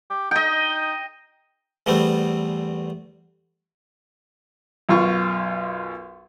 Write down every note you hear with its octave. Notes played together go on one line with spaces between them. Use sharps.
G4
D#4 D#5 G5
E2 G3 A3 B3 C4
B1 F#2 F4 C#6